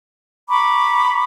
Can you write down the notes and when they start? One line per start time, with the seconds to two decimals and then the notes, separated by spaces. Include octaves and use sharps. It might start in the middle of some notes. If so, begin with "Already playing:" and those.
0.49 A#5 B5 C#6 D6